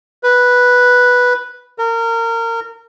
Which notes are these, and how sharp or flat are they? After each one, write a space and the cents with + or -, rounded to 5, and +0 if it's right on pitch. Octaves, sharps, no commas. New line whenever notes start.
B4 -5
A#4 -25